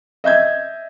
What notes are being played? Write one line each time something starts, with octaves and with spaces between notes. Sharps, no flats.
D#5 E5 G6 G#6